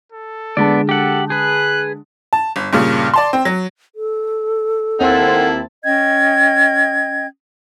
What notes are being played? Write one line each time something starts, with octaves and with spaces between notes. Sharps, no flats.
A4
D3 G#3 B3 D5 A5
G4 A4 F#5
G#4 B4 F#6
A5
G1
G2 A#2 C#3
D5 A5 C6
C4
F#3
A4
D#2 A#3 C4 E4 F#5 A5
C#4 D#5 G5 G#6